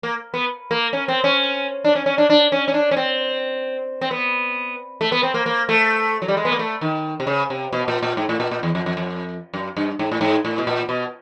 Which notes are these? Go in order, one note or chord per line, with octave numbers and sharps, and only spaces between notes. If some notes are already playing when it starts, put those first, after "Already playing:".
A#3
B3
A#3
C#4
C4
C#4
D4
C#4
C#4
D4
D4
C#4
C#4
D4
C#4
C4
C4
B3
A3
B3
C4
A#3
A#3
A3
F#3
G3
G#3
B3
A#3
A3
D#3
C3
C#3
C3
B2
A#2
A#2
G#2
A2
A#2
A#2
E2
F2
F2
F2
F#2
G2
G#2
A2
G#2
A2
B2
A#2
B2